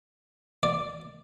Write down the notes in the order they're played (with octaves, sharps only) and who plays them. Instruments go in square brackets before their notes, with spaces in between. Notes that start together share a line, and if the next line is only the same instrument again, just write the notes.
[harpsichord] D5